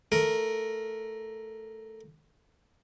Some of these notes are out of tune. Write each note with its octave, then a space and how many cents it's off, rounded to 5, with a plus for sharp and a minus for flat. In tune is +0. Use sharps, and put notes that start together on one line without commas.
A3 +0 A#4 +0